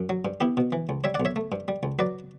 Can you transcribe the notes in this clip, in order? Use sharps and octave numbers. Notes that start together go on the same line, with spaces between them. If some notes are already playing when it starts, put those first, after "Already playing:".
Already playing: F#2
F#3
G2
B3 E4 G4
B2
E3
C#2
G3 C#5 E5
D5 F#5
B1
C#5 E5
A3
G2
G3
C#2
F#3 B4 D5